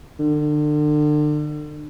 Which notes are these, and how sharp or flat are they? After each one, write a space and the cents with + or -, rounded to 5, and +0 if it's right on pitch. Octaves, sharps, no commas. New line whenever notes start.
D3 +35